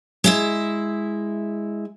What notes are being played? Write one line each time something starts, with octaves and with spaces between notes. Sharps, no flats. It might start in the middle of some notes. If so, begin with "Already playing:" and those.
G#3 E4 E5